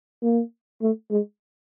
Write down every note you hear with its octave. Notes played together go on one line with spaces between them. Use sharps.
A#3
A3
G#3